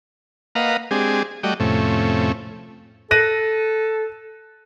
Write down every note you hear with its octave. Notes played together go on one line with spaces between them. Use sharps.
A#3 B4 D#5 F5 F#5 A#5
G#3 C4 D4 G4 G#4
G3 A3 F#4 D5 D#5 G5
F2 A2 C3 A3 C#4
A4 F#6 A#6 D#7